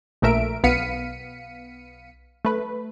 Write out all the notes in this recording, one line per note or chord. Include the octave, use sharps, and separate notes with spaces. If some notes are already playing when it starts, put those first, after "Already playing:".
A#1 A#2 A3 A#4 E5 D7
B1 B3 F5 B6 C#7 D#7
A3 B4